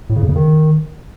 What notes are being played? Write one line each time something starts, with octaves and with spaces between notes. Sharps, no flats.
A2
C#3
F2
C#3
D#3